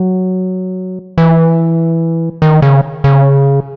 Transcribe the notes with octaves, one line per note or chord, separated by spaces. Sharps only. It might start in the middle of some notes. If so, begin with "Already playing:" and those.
Already playing: F#3
E3
D#3
C#3
C#3